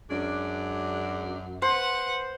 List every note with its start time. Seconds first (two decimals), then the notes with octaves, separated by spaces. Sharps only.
0.10 F#2 G#3 C#4 D4
1.62 B4 C5 F#5